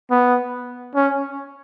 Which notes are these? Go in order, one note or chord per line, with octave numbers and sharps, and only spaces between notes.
B3
C#4